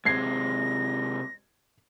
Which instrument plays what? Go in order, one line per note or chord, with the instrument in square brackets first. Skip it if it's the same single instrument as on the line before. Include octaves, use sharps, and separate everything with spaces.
[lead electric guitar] C3 G#3 [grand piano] G#6 C7 [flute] A#6